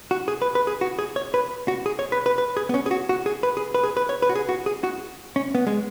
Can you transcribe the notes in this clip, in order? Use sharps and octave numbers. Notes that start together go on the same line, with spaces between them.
F#4
G#4
B4
B4
G#4
F#4
G#4
C#5
B4
F#4
G#4
C#5
B4
B4
B4
G#4
B3
C#4
G#4
F#4
F#4
G#4
B4
G#4
B4
G#4
B4
C#5
B4
F#4
G#4
F#4
G#4
F#4
C#4
B3
G#3